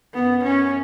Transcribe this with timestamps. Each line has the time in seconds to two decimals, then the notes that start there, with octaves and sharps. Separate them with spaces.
0.14 F#2 B3
0.43 C#4